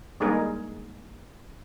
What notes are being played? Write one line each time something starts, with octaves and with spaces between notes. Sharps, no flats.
G3 G#3 A#3 D#4 G#4 A#4